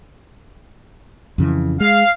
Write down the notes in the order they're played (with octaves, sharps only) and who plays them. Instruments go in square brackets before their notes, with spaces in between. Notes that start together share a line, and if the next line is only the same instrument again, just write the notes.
[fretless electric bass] F2 C#3 E3
[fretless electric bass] G#3 [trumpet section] F5